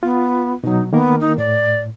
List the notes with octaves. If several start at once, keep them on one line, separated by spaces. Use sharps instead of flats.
B3 F4
B2 F#3 D#4
D#3 A#3 B3 A#4
D#4
A2 D5